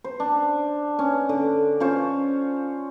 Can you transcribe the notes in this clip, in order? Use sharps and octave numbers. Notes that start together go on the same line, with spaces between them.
C5
D4
C#4
D3
C#4 F4 C5 C#5